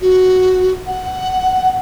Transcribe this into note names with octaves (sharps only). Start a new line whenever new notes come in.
F#4
F#5